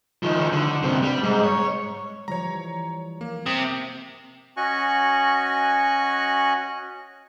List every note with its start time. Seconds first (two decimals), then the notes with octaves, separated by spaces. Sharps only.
0.23 D#3 F3
0.52 D3
0.83 G2 C3
1.03 G3
1.23 G#2
1.44 C#5
2.28 E3 F3 G3 C#5 A#5
3.21 A#3
3.46 C3 D#6
4.57 C#4 F#4 D#5 G#5 C#6 F#6